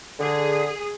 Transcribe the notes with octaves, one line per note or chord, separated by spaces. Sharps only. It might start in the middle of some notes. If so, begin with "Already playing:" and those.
D3 G#4